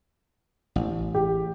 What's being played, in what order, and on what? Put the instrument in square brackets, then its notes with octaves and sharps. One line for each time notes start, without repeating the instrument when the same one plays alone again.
[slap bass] A1
[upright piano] G4